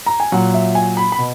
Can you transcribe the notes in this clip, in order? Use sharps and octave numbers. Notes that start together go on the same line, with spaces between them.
A#5
G#5
A#2 F#3 F#5
E5
G#5
B5
B5
B2